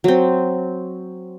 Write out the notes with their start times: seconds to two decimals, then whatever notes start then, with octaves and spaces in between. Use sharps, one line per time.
0.04 F#3 C4